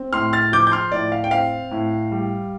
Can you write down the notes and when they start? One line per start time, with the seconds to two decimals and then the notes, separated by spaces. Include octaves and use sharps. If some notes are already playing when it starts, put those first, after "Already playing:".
Already playing: C4
0.13 A2 C6 F6
0.33 F6 A6
0.52 F3 D6 G6
0.67 G6
0.72 C6 F6
0.92 A2 D5
1.12 F5
1.24 G5
1.31 C4 F5
1.71 A2
2.11 G3